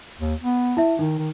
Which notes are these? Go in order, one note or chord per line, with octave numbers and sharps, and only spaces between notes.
D#2
B3
E4 E5
D#3 D#4
D#3